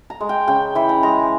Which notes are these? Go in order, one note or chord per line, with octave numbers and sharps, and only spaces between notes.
A#5
G#3
G5
C#3 G5
E3 B5
A#5
G#3 A#5